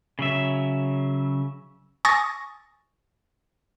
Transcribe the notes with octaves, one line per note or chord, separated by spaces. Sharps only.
C#3 F#3 E5
G#5 C#6 D#6 A6 A#6